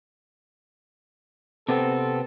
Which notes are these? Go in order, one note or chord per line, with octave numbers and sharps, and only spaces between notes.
C3 B3 C4 A4